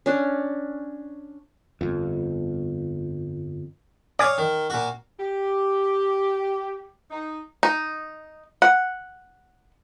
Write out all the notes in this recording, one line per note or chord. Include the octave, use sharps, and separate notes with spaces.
C#4 D4
G1 F2
C#5 D5 F5 G#5 D#6
D#3
A#2 F#4
G4
D#4
D#4
F#5